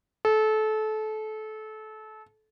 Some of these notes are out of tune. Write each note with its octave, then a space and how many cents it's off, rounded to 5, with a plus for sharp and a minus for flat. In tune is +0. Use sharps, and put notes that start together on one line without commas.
A4 -25